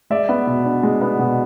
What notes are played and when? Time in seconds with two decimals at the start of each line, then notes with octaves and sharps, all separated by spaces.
0.10 G#3 D5 E5
0.29 B3
0.47 B2
0.65 D4
0.83 G#3
1.01 B3
1.19 B2